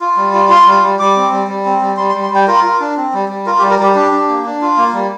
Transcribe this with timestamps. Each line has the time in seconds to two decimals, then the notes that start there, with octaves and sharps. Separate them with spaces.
0.01 F4
0.17 G3
0.33 F4
0.49 F4 C6
0.66 G3
0.82 G3
0.99 G3 D6
1.16 C4
1.32 G3
1.48 G3
1.65 C4
1.81 G3
1.97 G3 C6
2.09 C6
2.14 G3
2.23 C6
2.30 G3 G5
2.47 F4 A#4
2.64 F4
2.80 D4
2.97 C4
3.13 G3
3.29 G3
3.46 F4 A#4
3.59 G4
3.62 G3
3.70 A#4
3.79 G3 G4
3.95 D4 G4
4.11 D4
4.29 A#3
4.45 D4
4.62 F4
4.77 A#3
4.93 G3